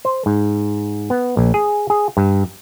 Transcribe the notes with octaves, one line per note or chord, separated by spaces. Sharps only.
C5
G#2
B3
A#1
G#4
G#4
G2